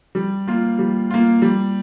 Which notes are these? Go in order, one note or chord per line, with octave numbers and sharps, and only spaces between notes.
G3
A#3 F4
G3
A#3 F4
G3